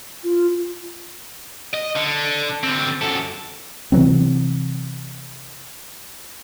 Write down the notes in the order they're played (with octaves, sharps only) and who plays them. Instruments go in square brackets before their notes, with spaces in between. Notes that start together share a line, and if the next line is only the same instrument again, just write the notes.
[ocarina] F4
[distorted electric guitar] D#5
D3
D3 C4
F#2 A4
[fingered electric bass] C3 E3 F#3 C4